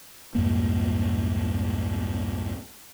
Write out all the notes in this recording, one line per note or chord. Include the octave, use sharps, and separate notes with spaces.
C2 F2 G#2 A#3